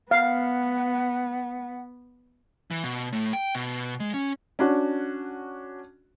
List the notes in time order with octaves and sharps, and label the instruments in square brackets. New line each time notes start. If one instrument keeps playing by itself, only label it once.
[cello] B3 [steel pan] F5 [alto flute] F#5
[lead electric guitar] E3
B2
A2
G5
B2
G#3
C#4
[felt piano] C#4 D4 F#4